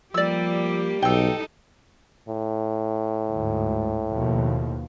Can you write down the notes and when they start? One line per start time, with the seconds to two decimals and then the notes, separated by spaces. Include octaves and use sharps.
0.14 F3 G3 A#3 G4 D5 E6
1.02 B1 D#4 A4 G5 E6
2.28 A2
3.31 D2 G#2
4.11 D#2 B2 F3